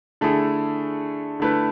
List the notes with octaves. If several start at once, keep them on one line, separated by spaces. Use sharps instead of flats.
D3 A3 E4 G#4
D3 A3 E4 B4